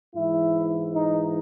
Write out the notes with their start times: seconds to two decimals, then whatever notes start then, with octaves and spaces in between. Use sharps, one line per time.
0.14 G#2 E3 E4
0.94 D#4